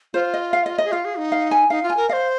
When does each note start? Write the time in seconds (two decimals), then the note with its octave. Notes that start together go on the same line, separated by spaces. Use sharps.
0.14 F4 C5
0.34 D#5
0.53 F5
0.66 D#5
0.78 D#5
0.84 G#4
0.92 F4 F5
1.05 G#4
1.18 D#4
1.32 F5
1.51 G#5
1.70 D#4 F5
1.83 F4
1.90 G#5
1.97 A#4
2.09 D#5 F5
2.13 C5